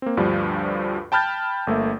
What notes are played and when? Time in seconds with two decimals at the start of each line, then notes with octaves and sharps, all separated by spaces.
0.02 A#3 C4
0.17 D2 G2 F3 G3
1.12 G5 A5 B5 F6 G6 A6
1.67 G1 A3 A#3 E5